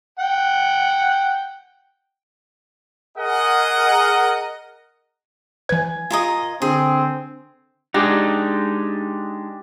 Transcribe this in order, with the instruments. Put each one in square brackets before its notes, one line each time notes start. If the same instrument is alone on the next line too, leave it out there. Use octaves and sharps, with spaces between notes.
[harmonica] F#5 G5
[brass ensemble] G#4 A#4 D#5 F#5
[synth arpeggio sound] E3 B4 [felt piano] G#5 G#6
[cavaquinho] F4 A#4 D#5
[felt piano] D3 [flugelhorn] C4 [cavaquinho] G#4
[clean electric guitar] G#3 D4 D#4 [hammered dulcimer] G4